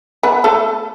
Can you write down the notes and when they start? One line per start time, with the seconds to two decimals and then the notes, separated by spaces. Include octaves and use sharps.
0.23 B3 B4
0.44 A3 A4